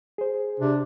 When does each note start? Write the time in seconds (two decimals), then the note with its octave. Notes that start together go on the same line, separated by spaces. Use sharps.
0.18 G#4 C5
0.60 C3 D4